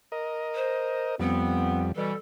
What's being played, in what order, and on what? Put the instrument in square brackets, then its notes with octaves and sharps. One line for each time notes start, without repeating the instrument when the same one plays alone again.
[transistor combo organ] A#4 D#5
[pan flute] C5
[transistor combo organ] F2 G3 [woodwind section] B3 [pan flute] C4
[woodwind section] B2 E3 G3 [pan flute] A4